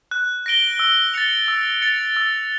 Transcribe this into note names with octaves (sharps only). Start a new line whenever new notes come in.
F#6
A#6 D7 G7
E6
A6 C#7 F7
E6
A6 C#7 F7
E6